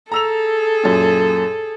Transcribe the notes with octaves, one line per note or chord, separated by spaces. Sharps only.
G#4 A4 A#5 E6 F7
F#2 A#2